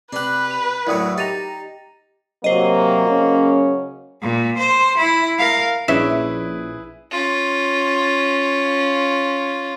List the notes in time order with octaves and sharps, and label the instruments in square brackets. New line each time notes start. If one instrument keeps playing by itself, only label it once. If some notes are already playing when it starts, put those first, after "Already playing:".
[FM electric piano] C3 F#6 [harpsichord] D4 G4 [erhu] B4
[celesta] F7
[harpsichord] D2 A2 F#3 [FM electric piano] E4 [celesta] A#4 D5 D#6
[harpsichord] D#4 [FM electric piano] G4 A#5 [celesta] A6 D#7 F7
[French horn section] C3 F#3 [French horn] A#3 [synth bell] C5 D#5
[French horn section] C#3 F#3 C#4
[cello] A#2
C5
E4
A#4 F5
[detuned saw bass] A#1 [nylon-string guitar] C#4 D4 [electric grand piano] E4 G#4 B4 [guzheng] E5
[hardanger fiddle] C#4 F4